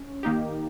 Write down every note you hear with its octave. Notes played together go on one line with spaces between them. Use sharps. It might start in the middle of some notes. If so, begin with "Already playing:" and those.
Already playing: C#4
D#3 A#3 D#4 G4